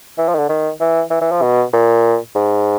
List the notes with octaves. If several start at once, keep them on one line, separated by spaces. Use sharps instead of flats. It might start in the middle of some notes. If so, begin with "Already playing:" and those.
E3
F3
D#3
D3
D#3
E3
E3
E3
F3
B2
A#2
G#2